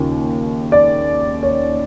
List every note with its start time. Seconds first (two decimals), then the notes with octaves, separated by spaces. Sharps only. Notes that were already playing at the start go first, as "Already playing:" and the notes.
Already playing: D#2 C#3 F3
0.72 D5
1.43 C#5